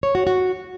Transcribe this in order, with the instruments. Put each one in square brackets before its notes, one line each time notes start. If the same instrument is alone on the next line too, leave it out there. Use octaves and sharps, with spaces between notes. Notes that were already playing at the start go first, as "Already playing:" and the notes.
[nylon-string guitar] C#5
F#4
F#4